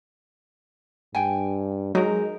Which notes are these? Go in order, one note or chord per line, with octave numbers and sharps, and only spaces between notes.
G2 G5 G#5
F#3 G#3 D#4 A#4